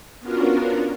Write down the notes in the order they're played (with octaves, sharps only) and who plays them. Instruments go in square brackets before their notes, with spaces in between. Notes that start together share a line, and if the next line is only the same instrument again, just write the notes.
[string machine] B3 C#4 D4 F4 F#4 A#4